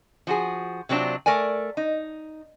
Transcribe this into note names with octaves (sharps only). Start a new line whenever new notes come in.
F3 F#4 G#4
C3 F#3 C4 D4 F4
A3 A#4 D5 G#5
D#4